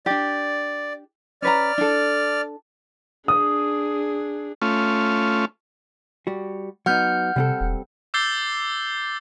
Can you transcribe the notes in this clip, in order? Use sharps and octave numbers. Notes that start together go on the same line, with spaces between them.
D4 G4 D5
C#4 B4 D5 A#5 F6
D4 A4
D4 G#4 D#6
A3 C#4 F4
G3 F#4
F#3 B3 D#4 F#5 F6 G6
C3 G3 C4 A4
E1
D6 E6 G6 A6 C7 G7